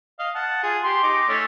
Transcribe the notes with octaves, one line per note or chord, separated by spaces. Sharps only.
D#5 F5
F#5 A5
F4 G#4
G4 C6
D#4 D6
A3 C#4 C#5